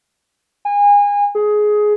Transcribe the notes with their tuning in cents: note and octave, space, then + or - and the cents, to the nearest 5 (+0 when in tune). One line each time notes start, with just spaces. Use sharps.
G#5 -30
G#4 +15